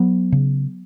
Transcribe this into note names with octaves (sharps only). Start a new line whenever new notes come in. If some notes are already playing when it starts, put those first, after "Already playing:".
Already playing: F#3 B3
C#3